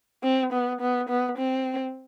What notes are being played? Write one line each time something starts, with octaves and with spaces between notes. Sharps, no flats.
C4
B3
B3
B3
C4